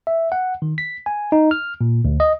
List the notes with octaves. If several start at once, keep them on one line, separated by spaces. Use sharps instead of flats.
E5
F#5
D#3
B6
G#5
D#4
F6
A#2
D2
D#5